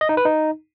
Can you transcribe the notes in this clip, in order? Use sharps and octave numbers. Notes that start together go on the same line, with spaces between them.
D#5
D#4
B4
D#4